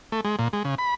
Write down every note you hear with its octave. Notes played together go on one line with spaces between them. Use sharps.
A3
G#3
A#2
G#3
C#3
B5